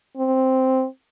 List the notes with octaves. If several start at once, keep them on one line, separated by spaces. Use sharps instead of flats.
C4